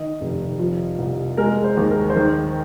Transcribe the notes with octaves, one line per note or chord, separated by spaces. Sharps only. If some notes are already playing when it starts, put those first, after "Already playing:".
Already playing: D#3 D#5
F1
F3
C2
G#3 A#4
C5
D#2
A#4
C5
D#3 A#4